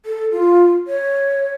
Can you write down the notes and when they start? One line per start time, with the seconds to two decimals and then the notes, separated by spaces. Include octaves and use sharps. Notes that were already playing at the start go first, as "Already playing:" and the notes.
0.06 A4
0.32 F4
0.87 C#5